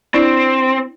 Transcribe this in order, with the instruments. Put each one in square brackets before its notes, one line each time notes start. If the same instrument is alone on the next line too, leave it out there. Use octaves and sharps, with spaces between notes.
[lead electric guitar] C4 [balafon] D4 E4 D5